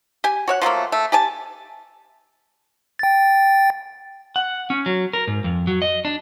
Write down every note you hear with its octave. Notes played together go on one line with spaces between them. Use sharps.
G4 G#5
F#4 C#5 F#5
F3 F#3 A3 A#3
A3
G4 G#5 A5
G5 A6
F#5
C#4
F#3
A#4
G#2
F2
F#3
D#5
D4